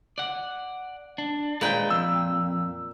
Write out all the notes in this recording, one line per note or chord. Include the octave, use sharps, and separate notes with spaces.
D5 F#5
D4
A#2 G#3 B4 G5
F2 E6